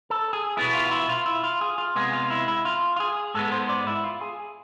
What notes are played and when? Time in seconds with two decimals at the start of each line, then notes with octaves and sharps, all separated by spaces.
0.10 A4
0.33 G#4
0.57 B2 B3 E4 G#4
0.74 F4
0.91 E4
1.09 F4
1.26 E4
1.44 F4
1.61 G#4
1.78 F4
1.95 C3 G#3 B3 G#4
2.13 F4
2.30 E4
2.48 E4
2.65 F4
2.96 F4
3.00 G#4
3.34 G#2 G#3 B3 A4
3.52 C5
3.69 D5
3.87 E4
4.04 F4
4.21 G#4